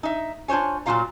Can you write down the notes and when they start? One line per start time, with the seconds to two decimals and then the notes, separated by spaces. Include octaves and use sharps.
0.03 D#4 E5
0.48 D4 F4 C5 C#5 G#5
0.86 A#2 F#3 D#4 F4 F5 A#5